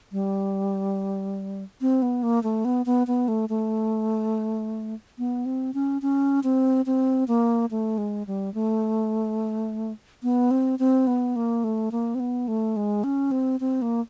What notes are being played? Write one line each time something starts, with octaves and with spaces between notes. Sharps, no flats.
G3
C4
B3
A#3
A3
B3
B3
B3
A3
A3
B3
C4
C#4
C#4
C4
C4
A#3
A3
G#3
G3
A3
B3
C4
C4
B3
A#3
A3
A#3
C4
B3
A3
G#3
C#4
C4
C4
A#3